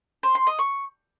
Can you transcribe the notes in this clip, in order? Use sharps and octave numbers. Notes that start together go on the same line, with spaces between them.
C5
C6
D#5
C#6